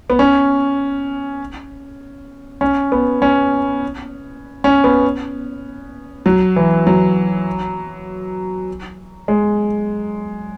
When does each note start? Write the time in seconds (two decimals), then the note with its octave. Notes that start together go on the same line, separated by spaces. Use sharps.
0.10 B3
0.19 C#4
2.61 C#4
2.92 B3
3.22 C#4
4.64 C#4
4.84 B3
6.26 F#3
6.56 E3
6.87 F#3
9.28 G#3